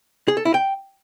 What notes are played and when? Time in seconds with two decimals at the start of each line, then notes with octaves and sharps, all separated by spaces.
0.28 G#4
0.37 A4
0.45 E4
0.54 G5